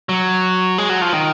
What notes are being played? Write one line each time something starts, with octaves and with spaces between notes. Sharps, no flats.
F#3
G#3
F#3
F3
D#3